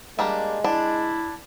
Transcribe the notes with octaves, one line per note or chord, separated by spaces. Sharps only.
G3 G#3 A#3 D4
D4 E4